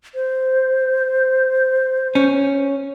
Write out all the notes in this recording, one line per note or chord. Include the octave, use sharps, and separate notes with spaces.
C5
C#4